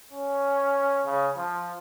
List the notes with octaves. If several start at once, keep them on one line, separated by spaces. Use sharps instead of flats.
C#4
C#3
F3